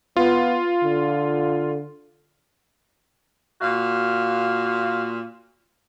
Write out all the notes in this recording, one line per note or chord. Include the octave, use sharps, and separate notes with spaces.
B3 F4
D3
A#2 F#4 F5